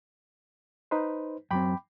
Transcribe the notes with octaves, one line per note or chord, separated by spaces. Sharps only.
D#4 B4 C5
F#2 F#3 C4 G5 B5 D6